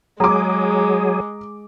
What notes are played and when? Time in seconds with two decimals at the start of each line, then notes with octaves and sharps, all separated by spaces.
0.20 F#3 G#3 G#4 A#5 D6